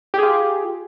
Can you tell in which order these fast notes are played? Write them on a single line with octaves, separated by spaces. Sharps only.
G4 G#4 F4